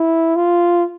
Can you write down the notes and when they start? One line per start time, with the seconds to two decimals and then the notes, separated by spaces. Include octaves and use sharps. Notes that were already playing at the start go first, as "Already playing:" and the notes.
Already playing: E4
0.36 F4